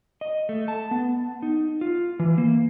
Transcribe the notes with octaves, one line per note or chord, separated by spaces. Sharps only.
D#5
A3
A5
B3
D#4
F4
E3
A#3